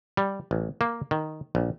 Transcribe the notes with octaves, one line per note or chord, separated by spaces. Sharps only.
G3
A1
A#3
D#3
A#1